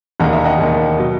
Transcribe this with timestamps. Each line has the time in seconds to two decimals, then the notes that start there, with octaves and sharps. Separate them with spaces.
0.20 E1 D#2 D#3 F#5 A#5
0.33 E5
0.45 D#5 F#5
0.58 E1 D#2 D#3
0.98 B2 F#3